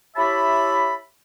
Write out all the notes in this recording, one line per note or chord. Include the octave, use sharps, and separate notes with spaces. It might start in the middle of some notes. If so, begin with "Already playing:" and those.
E4 G4 C#5 E5 A5 B5